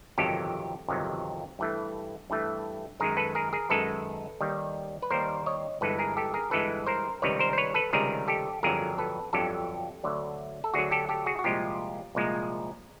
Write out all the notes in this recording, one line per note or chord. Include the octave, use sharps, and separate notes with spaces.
G1 F2 C3 D#3 F#3 G4 A4
G1 F2 C3 D#3 F#3
G2 E3 A3
G2 E3 A3
F#2 D#3 G#3 G#4 A#4
A4 B4
G#4 A#4
G#4 A#4
F#2 D#3 G#3 A4 B4
D#2 D#3 G3
B4
D#2 D#3 G3 A#4 C5
C#5 D#5
G1 G2 E3 G#3 A4 B4
G#4 A#4
G4 A4
G#4 A#4
G1 G2 E3 G#3 A4 B4
A#4 C5
C#2 C3 D#3 G3 B4 C#5
A#4 C5
C5
B4 C#5
A4 B4
C#2 C3 D#3 G3 G#4 A#4
G4 A4
G1 F2 D3 F#3 G#4 A#4
A4 B4
G1 F2 D3 F#3 G4 A4
D2 D3 F#3
A4
D2 D3 F#3 F#4 G#4
G4 A4
G4 A4
F#4 G#4
F#4
C2 A#2 F3 G#3 F4 G4
C2 A#2 F3 G#3